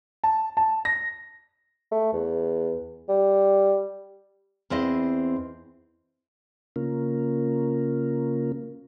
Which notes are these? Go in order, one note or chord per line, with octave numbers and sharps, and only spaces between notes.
A5
A5
A#6
A3
E2
G3
E2 C4 E4 D#5
C#3 A#3 C#4 F4 A#4